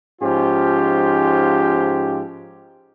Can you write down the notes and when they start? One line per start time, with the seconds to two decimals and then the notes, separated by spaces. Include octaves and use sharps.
0.22 G#2 F3 C#4 D#4 F4 G4